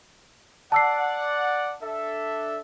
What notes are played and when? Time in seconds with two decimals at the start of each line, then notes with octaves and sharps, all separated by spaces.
0.72 D5 F#5 A5 E6 C7
1.82 D4 A4 E5